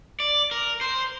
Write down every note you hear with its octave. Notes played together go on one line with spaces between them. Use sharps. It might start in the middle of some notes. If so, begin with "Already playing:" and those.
D5
A#4
C5